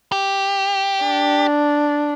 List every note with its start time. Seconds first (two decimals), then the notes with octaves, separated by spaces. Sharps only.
0.12 G4
1.04 D4